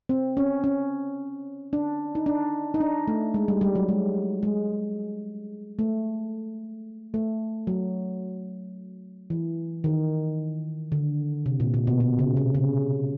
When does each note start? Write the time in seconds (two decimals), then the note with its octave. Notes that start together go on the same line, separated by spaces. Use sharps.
0.09 C4
0.37 C#4
0.64 C#4
1.73 D4
2.15 D#4
2.26 D4
2.74 D#4
2.80 D4
3.08 A3
3.34 G#3
3.48 G3
3.61 G3
3.75 F#3
3.89 G#3
4.43 G#3
5.79 A3
7.14 A3
7.67 F#3
9.30 E3
9.84 D#3
10.92 D3
11.46 C3
11.60 A#2
11.74 A#2
11.87 B2
12.00 B2
12.19 C#3
12.37 C3
12.55 C#3